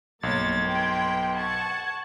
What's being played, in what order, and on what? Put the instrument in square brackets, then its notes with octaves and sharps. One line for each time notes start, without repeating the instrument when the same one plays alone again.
[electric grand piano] B1 [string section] G2 A#3 A6 [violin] C#5 C6 [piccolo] G#6
[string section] B4 G5 B5 [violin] C6
[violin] F#5 [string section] A5 C#6 [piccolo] G#6